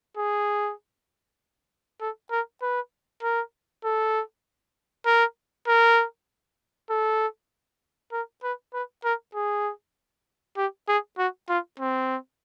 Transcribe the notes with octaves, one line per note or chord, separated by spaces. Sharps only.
G#4
A4
A#4
B4
A#4
A4
A#4
A#4
A4
A#4
B4
B4
A#4
G#4
G4
G#4
F#4
F4
C4